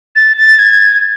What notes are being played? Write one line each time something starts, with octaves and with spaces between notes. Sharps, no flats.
A6
A6
G#6